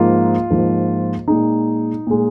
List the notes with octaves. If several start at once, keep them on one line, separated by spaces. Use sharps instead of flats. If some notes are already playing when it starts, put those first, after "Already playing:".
Already playing: G#2 F3 A#3 F4
G#2 F3 A#3
A#2 G#3 D#4
A#2 G#3